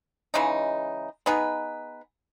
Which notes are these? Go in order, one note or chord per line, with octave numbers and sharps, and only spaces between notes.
C#3 E3 G#3 D#4
B3 D#4 G#4 B4